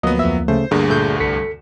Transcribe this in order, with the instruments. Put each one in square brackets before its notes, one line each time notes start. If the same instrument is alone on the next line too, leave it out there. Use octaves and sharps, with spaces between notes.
[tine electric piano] D2 F3 A#3 [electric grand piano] F#3 B3 [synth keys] D#5
[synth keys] F2 E5
[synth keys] C#3 A3 [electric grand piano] C5
[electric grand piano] D2 G2 D3 [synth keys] A#3 [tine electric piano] G#4
[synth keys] A#2 A3 G6
[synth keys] C2 [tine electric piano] A4 B6 C#7